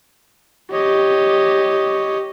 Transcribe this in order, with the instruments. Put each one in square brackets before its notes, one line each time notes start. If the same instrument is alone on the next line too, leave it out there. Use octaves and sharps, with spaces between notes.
[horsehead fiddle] G4 [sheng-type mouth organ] C#5 D#5